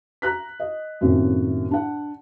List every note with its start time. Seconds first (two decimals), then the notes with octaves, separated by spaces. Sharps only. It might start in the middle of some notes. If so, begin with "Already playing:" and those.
0.22 A#5 F#6 B6
0.60 D#5
1.01 F#2 A2 C3 D#3 A#3
1.71 D4 F#5